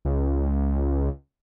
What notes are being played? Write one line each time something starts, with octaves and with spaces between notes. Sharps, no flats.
C#2